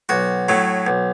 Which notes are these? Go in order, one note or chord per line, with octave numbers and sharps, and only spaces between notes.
B1 F#4
A2 F#3 A3
B1